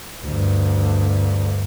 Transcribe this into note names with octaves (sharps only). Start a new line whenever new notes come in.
D2 G2